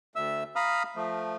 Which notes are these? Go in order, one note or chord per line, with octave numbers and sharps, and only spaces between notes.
D2 E5 E6
F5 A#5 B5 D#6 F6
F3 A3